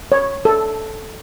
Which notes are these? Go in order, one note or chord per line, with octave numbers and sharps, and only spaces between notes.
C#5
A4